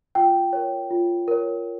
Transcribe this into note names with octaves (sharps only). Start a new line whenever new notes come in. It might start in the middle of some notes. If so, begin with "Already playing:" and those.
F4 G5
A#4 C#5
F4
A#4 C#5